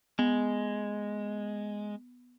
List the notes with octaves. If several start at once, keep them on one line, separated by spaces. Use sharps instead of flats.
G#3 B3